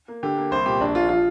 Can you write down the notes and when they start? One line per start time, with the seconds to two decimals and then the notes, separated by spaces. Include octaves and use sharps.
0.08 A#3
0.23 D3 G4
0.37 A#3
0.51 C2 C5
0.66 A#2 G4
0.80 A#1 D4
0.95 A#1 F4
1.09 F3 F4